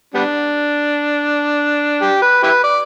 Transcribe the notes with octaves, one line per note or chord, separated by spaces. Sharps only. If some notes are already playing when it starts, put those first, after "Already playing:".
G3 B3 D4
G4
B4
E4 G4 B4
D5